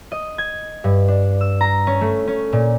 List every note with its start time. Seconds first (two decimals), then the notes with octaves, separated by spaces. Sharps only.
0.12 D#5
0.38 G#6
0.84 G2
1.08 D4
1.41 E6
1.61 A#5
1.87 C#4
2.01 A3
2.27 C#4
2.53 A#2